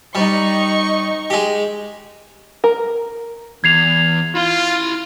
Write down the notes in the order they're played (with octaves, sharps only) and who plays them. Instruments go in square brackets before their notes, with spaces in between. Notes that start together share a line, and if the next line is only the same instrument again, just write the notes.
[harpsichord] G3 [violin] D#4 C#6
[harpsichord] G#3 G4
[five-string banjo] A#4
[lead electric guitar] E2 [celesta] G#6 C7 F7
[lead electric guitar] E4 C6 [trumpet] F4